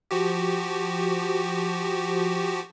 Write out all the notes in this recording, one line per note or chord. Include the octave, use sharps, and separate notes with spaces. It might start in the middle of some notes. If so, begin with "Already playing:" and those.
F3 F#4 G4